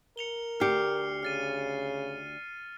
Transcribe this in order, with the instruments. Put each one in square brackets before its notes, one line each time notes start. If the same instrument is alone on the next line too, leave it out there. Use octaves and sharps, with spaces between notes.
[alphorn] A#4 [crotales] C#7 F7 G7
[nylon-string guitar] D2 G4 [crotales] F6 C7 C#7
[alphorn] C#3 [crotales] F6 A6 D#7